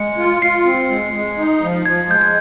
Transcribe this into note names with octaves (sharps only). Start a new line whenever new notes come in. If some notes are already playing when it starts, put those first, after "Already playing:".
Already playing: G#3 C#7
F4
F4 C7
C4
G#3
G#3
D#4
F3
F3 G#6
G#3 G6
G#6